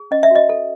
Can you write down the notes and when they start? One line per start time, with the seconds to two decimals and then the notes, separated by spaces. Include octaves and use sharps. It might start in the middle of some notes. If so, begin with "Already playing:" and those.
Already playing: G#4
0.11 C#4 D#5
0.23 E5
0.31 F#4 D#5
0.49 A4